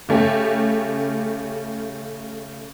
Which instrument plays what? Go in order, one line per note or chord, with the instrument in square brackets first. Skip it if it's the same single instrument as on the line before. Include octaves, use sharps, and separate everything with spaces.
[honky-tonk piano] C#3 A3 C#4 G4